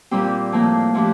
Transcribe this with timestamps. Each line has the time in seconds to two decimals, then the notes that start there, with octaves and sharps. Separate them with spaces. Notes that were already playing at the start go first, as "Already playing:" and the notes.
0.11 A#2 G3 C4 G4
0.52 A2 F3 A#3
0.94 A2 F3 A3 D4 G4